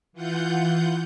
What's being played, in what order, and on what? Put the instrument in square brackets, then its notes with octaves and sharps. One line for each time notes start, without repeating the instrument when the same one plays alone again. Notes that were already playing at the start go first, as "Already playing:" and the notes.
[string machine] E3 F4 F#5 G6